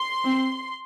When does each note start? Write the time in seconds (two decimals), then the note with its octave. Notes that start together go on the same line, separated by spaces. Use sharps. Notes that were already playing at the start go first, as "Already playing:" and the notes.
Already playing: C6
0.24 C4